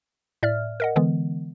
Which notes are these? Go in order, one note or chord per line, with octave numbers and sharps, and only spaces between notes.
A2 D5 E5 F6
A#4 D#5 F#5
D3 E3 G#3 B3